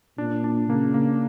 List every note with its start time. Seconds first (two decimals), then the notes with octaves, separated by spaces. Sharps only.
0.18 A#2 D4
0.44 D4
0.69 C#3 A#3
0.94 A#3